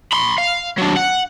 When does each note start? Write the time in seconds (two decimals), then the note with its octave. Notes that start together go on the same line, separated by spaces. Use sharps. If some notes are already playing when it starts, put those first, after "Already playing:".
0.13 B5 C6
0.38 F5
0.78 F#3 D4
0.96 F#5